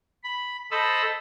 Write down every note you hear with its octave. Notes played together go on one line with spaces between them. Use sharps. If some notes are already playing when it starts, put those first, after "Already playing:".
B5
A4 C5 D#5 B5 E6